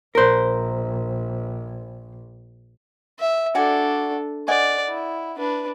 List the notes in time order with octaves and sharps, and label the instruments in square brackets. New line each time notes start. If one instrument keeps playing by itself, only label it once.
[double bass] A#1 [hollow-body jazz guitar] A#4 C5
[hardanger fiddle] E5
[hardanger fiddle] D4 A4 [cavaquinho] F#4 D5 G#5
[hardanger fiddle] D5 [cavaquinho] D#5 F#5 G#5
[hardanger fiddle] E4
D4 B4